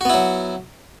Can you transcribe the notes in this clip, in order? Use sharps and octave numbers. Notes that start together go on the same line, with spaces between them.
F#3 B3 E4 F#4